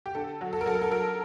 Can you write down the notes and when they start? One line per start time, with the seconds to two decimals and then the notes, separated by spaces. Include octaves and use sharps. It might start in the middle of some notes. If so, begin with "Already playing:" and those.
0.06 G4
0.15 D3 A4
0.41 F#3
0.53 A4
0.61 A#4
0.66 F#3 A4
0.75 A#4
0.82 A4
0.91 F#3 A#4